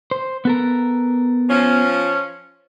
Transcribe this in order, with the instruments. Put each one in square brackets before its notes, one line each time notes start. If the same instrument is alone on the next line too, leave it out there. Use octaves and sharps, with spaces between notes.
[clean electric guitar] C5
B3 A4 A#4
[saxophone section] F3 C#4